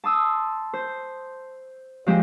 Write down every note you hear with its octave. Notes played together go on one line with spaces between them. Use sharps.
A5 C6 D#6 E6
C5
F3 G#3 C4 G4 C5